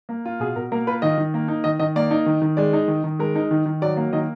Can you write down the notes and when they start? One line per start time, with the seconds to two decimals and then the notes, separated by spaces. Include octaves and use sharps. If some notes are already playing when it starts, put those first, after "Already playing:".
0.09 A#3
0.26 F4
0.40 B2 G#4
0.56 B2 A#4
0.72 A#3 A#4
0.87 F4 B4
1.02 D#3 D#5
1.18 D#3
1.34 A#3
1.48 D#4
1.64 D#3 D#5
1.79 D#3 D#5
1.96 A#3 D5
2.11 D#4
2.26 D#3
2.42 D#3
2.57 G#3 D5
2.73 D#4
2.88 D#3
3.04 D#3
3.19 G#3 A#4
3.36 D#4
3.51 D#3
3.66 D#3
3.82 F#3 D5
3.97 A#3
4.13 D#3 D#5